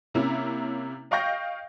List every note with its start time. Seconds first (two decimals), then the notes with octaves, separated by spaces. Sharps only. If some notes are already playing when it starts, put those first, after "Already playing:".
0.14 C3 A#3 C#4 E4
1.11 D#5 F5 G5 C#6 G6 A#6